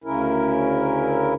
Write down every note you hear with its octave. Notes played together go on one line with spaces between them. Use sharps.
D2 C#3 C#4 E4 A#4